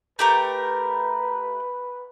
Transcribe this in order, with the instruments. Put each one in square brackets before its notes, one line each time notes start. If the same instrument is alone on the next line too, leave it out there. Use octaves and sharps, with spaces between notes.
[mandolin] A3 G4 A#4 [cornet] B4